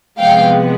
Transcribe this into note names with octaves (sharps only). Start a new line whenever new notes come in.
C3 F3 G#3 B3 F5 G5